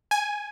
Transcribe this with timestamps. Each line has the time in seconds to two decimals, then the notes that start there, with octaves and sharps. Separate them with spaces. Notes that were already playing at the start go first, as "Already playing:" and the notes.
0.11 G#5